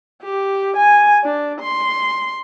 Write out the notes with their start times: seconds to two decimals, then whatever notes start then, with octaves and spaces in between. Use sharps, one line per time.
0.23 G4
0.76 G#5
1.24 D4
1.60 C6